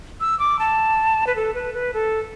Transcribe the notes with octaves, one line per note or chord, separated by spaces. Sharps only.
E6
D6
A5
B4
A4
B4
B4
A4